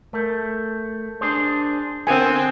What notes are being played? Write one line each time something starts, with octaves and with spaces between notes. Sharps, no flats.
A3 A#4 G6
D4 G#4 C5
D3 B3 C4 A#4 G#5 A6 C7